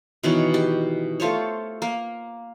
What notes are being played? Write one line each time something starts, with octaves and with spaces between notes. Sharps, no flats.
B2 D#3 E3 C#5
G4
A3 F4 C5 C#5
A#3